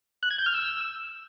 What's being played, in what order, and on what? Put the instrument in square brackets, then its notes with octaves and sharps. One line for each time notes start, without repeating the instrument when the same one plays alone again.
[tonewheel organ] F#6
G#6
G6
F6
E6